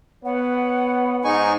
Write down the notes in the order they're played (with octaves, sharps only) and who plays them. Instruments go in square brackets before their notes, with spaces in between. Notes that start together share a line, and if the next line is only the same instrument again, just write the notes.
[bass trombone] B3 [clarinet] C#5 [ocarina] F#5
[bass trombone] G#2 [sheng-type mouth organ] D#4 G#5 C#6